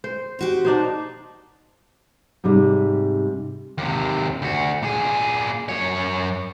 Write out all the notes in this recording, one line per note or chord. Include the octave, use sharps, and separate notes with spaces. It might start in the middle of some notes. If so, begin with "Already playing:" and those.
C5
C4 F#4 G4
D4 D#4 C5
G#2 C3 G3 D#4
D#2 C3
D2 F#4
A#2 G#4
F#2 C#5